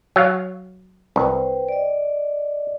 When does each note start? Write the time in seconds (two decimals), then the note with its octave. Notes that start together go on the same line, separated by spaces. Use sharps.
0.16 F#3 F5
1.16 C2 B4 C5 G5
1.69 D5 D#5